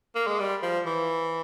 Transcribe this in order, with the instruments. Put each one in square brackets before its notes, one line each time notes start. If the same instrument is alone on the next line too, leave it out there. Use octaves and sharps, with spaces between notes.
[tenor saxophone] A#3
G#3
G3
F3
E3